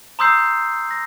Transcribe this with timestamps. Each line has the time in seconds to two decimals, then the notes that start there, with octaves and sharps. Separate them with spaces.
0.19 A#5 C6 D#6 E6 G6 C7
0.91 A#6